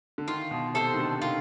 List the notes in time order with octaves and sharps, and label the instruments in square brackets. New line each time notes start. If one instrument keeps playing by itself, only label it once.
[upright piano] D3
[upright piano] D#3 [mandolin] F4
[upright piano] B2
[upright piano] C3 [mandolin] A4 C5
[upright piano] D#3
D3
[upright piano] D#3 [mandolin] F4